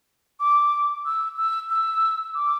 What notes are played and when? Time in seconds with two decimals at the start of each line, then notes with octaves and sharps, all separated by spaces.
0.40 D6
1.05 E6
1.37 E6
1.70 E6
2.35 D6